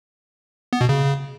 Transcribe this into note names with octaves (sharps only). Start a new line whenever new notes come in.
B3
B2
C#3